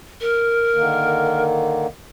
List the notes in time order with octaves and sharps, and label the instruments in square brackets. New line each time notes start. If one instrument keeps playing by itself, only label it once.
[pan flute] A#4
[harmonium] D3 D#3 A#3